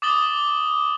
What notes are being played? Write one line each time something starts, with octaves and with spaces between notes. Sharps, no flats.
D6 D#6 A6 F#7 G7